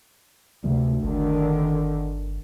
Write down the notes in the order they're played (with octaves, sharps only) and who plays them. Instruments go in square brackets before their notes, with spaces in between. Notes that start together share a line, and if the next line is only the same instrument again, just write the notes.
[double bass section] D2 [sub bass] C3
[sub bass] G1 [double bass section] D3 D#3